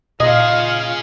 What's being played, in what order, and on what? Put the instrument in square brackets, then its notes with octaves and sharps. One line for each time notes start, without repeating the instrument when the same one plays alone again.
[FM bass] A#2 [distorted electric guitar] C#3 G#4 [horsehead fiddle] F4 F5 [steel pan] D#5